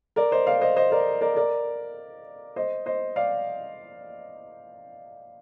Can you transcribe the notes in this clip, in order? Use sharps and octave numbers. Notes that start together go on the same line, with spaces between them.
A#4 D5
C5 D#5
D5 F5
C5 D#5
C5 D#5
A#4 D5
A#4 D5
A#4 D5
C5 D#5
C5 D#5
D5 F5